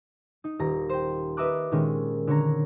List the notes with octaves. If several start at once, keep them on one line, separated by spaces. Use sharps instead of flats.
D#4
D#1 A#5
C5 G5
B4 D#5 E5 A#5 D6 F#6
A#2 D#3 G#3 C#4
D3 C#5 A#5